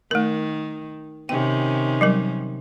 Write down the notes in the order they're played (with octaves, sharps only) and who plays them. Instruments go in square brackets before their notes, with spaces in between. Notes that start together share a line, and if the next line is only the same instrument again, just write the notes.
[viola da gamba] D#3 [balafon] A3 A#4
[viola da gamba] C3 D#3 C#4 [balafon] G5
[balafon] F#3 G3 A#4